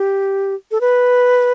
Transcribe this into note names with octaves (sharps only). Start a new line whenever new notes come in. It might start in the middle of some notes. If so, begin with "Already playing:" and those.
Already playing: G4
A4
B4